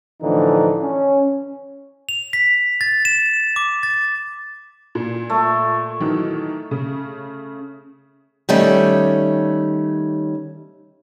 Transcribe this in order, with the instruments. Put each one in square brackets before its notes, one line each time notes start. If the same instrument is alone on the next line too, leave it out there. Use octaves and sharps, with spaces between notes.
[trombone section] A2 D3 E3 F3 D#4
C#4
[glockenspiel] F7
B6
A6
E7
D6
A6
[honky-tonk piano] A#2
[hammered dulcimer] A3
[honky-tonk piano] D#3 E3 F#3
C#3
[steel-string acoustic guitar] D#3 G3 A3 C#4